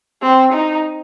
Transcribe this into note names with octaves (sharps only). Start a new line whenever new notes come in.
C4
D#4